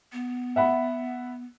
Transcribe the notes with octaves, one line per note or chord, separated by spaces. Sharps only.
B3
E5 F#5 B5